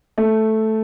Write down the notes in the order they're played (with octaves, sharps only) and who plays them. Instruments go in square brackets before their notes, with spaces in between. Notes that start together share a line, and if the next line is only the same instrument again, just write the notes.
[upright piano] A3